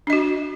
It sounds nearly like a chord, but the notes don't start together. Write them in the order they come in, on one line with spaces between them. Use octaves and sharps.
D4 D#5 F#4